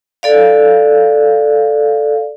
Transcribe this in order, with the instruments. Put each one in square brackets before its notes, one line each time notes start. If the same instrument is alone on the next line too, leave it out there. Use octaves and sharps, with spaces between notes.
[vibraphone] A4 D5 F5